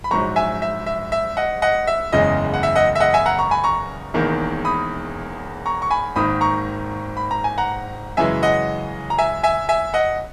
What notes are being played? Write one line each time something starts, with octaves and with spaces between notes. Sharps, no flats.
B5
A#1 G#2 F#3 A#5 C#6
E5 G#5
E5
E5
E5
D#5 F#5
D#5 F#5
E5
F#1 E2 C#3 G#3 D#5
F#5
E5
D#5 F#5
E5
D#5 F#5
E5 G#5
F#5 A#5
A#5 C#6
G#5 B5
A#5 C#6
E1 E2 D#3 A#3
B5 D#6
A#5 C#6
C#6
G#5 B5
G#1 G#2 D#3 A#3 B5 D#6
A#5 C#6
B5
A#5
G#5
F#5 A#5
F#2 C#3 E3 G#3 E5 G#5
D#5 F#5
A#5
E5 G#5
E5 G#5
E5 G#5
D#5 F#5